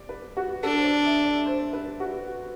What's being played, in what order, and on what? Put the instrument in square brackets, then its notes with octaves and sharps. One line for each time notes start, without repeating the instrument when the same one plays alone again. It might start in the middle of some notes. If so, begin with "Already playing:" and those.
Already playing: [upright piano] D5
B4
F#4
[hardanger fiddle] D4 [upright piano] A4
[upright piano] C5
D5
E5
D5
C5
B4
F#4